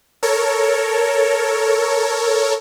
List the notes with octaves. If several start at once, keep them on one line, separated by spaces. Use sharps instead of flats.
A4 A#4 C#5